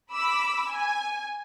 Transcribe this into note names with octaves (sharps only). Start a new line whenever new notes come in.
B5 D6 E6
G#5